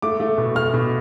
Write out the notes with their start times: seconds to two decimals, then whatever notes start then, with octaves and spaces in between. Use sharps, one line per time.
0.02 A3 D6
0.20 A3
0.38 B2
0.55 A3 F6
0.74 B2